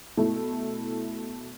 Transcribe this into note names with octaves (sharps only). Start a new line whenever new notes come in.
B2 A3 E4